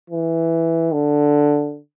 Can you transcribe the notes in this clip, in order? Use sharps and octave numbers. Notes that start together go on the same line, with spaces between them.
E3
D3